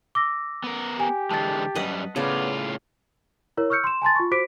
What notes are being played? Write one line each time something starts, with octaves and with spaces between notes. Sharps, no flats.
D6 E6 A#6
B3 A#4
G4 G#5
D3 E3 G#3 A5 A6
F#2 G3 B4 D#5 F#5
A2 C#3 B3 F4 D5
E4 A#4 C#5
C#6 E6 F6 G6 C#7
C6 E7
G#5 A5 C6 A6
F4 C#6
F#4 C5 D6 B6 D7